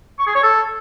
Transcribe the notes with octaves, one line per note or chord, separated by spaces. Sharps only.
C#6
G#4
C#5
A4